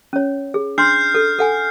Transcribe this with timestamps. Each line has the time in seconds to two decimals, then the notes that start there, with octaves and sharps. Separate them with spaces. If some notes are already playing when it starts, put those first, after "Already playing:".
0.13 C#4 C#5
0.54 G#4
0.78 D4 C6 F6 G6 C7
1.15 A4
1.39 A4 F#5 G#5